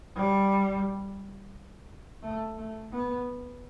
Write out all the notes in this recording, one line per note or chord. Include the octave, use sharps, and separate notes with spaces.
G3
A3
A3
B3